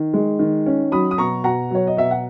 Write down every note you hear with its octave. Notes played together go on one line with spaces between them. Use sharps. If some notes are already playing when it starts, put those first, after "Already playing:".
Already playing: D#3
G#3
D#3
C#4
F#3 B5 D#6
D#6
B2 A#5 C#6
B2 F#5 A#5
F#3 C#5
D#5
B2 E5
F#5